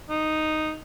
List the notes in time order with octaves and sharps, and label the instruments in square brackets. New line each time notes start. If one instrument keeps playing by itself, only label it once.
[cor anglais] D#4